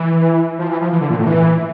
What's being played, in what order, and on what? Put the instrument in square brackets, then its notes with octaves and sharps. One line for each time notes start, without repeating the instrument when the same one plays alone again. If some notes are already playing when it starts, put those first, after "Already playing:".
Already playing: [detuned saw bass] E3
F3
E3
F3
E3
D3
A#2
A2
E3